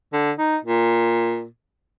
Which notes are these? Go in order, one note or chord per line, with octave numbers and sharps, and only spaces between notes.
D3
D#4
A#2